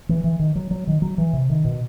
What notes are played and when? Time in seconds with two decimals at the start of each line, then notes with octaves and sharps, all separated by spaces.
0.09 E3
0.24 E3
0.39 D#3
0.55 F#3
0.71 F#3
0.87 D#3
1.02 F#3
1.18 E3
1.33 C3
1.50 D#3
1.65 B2